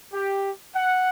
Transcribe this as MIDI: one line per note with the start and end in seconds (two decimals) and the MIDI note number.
0.13 0.51 67
0.73 1.10 78